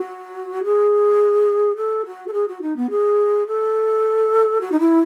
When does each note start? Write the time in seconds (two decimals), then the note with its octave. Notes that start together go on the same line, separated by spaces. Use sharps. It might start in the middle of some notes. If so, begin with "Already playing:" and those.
Already playing: F#4
0.64 G#4
1.76 A4
2.06 F#4
2.28 A4
2.33 G#4
2.48 F#4
2.62 D#4
2.77 B3
2.90 G#4
3.47 A4
4.61 F#4
4.72 D#4
4.80 E4